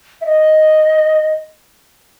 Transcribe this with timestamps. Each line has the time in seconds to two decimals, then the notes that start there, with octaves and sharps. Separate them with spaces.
0.21 E5
0.25 D#5